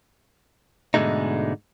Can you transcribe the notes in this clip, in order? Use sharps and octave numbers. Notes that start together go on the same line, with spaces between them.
G#2 B2 D3 G#3 A3 D#4